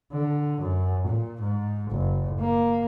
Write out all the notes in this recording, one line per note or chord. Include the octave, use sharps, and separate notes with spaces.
D3
F#2
A#2
G#2
F#1
A#3